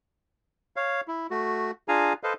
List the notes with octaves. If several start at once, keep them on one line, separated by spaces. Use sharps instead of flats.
C#5 F5
E4
A3 F#4
D4 F4 G#4 F5 G#5 A#5
A4 B4 C5 D#5 F5